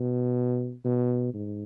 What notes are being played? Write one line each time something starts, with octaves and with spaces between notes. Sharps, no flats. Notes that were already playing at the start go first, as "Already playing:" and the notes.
Already playing: B2
B2
G#2